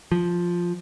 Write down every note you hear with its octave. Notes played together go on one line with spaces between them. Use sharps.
F3